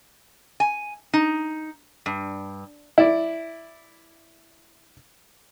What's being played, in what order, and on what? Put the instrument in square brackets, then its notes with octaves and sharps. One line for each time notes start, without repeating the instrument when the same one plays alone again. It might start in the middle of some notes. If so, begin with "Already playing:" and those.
[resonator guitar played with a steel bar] G#5
D#4
G2
[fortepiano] E4 D5